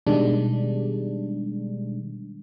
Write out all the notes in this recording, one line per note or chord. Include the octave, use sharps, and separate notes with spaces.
B2 D#3 G3 G#3 D4